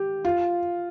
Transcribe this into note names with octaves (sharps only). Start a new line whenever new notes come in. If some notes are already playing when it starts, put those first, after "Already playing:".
Already playing: G4
F4